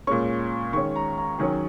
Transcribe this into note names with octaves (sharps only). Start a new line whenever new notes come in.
A#2 G#3 C#4 C#6
D#3 G#3 C#4 C#6
A#5
A#5
D#3 F#3 C#4 G#4